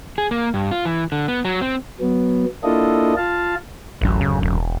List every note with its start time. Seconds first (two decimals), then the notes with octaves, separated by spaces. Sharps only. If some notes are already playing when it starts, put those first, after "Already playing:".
0.18 G#4
0.31 A#3
0.54 G2
0.71 F4
0.85 E3
1.12 D3
1.28 B3
1.45 F#3
1.61 C4
2.00 F#3 B3
2.64 A#3 D4 E4 F4 A4 D#5
3.17 F4 F5 A5
4.01 D1 A1 F#2
4.21 C#3
4.43 E1